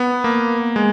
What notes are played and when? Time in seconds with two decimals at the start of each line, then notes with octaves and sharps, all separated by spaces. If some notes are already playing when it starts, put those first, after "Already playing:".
Already playing: B3
0.24 A#3
0.76 G#3